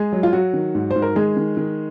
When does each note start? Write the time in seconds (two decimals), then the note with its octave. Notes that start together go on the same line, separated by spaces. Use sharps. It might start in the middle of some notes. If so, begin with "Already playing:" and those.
Already playing: G#3 G#4
0.13 F#3
0.23 F4
0.33 F#3 F#4
0.54 D#3
0.75 G#2
0.91 C5
0.96 G#2
1.02 A#4
1.16 D#3 G#3 G#4
1.37 D#3
1.57 D#3